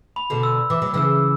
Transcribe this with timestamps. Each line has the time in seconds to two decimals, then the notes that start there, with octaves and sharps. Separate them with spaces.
0.16 B5
0.30 B2 D3
0.43 E6
0.70 E3 D6
0.82 F#3
0.94 C#3 E3 E6